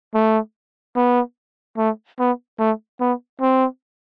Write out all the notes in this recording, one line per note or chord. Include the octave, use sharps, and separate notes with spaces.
A3
B3
A3
B3
A3
B3
C4